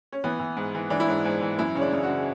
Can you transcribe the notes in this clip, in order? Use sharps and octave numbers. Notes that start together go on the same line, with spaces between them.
C#4
E3 B3
E3
G#2
E3
E3 D4
E4
G#2 D4
G#2
E3
F#2 E4
C#3 C#4
D4
C#3
F#4
C#3